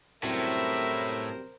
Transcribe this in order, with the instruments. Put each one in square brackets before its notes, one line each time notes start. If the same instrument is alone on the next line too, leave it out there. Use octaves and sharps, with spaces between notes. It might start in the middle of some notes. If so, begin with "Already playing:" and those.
[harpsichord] F#2 C3 G3 [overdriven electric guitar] A2 [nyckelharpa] A#4 C5 [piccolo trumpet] E5